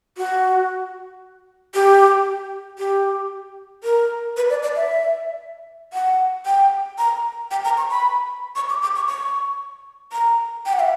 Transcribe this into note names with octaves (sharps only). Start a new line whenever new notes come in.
F#4
G4
G4
A#4
B4
D5
D5
E5
F#5
G5
A#5
G5
A#5
C#6
B5
C#6
D6
D6
C#6
C#6
A#5
G5
F#5
E5